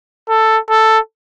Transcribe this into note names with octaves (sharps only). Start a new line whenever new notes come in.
A4
A4